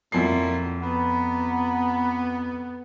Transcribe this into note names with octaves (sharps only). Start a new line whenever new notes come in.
F2 A#2 F#3 E4 C7
B3 F#5 A#5 B5